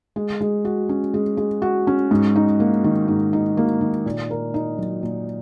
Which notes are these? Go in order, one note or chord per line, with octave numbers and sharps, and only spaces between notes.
G#3
G#3
F#4
C#4
G#3
G#3
F#4
C#4
G#2
D#4
A#3
D#3
G#2
D#4
A#3
D#3
A#2
A#4
D#4
F#3
A#2